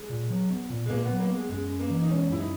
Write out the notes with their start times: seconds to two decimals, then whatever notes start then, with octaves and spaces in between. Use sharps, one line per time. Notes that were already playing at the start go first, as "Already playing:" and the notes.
Already playing: G#3
0.10 A#2
0.30 F#3
0.50 B3
0.70 A#2
0.86 G#3
0.90 A#2 A#3
1.05 F#3 B3
1.19 A#3
1.30 B3
1.35 G#3
1.49 F#2 G#3
1.69 C#4
1.80 A#3
1.90 E3
2.02 D#4
2.10 G#3 C#4
2.30 F#2 E4
2.39 D#4